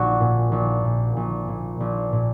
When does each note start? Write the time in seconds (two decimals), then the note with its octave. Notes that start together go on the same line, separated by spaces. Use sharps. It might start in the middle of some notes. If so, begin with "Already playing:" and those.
Already playing: A#1 F#4
0.20 A#2
0.52 A#1
0.84 A#2
1.17 A#1
1.48 A#2
1.80 A#1
2.12 A#2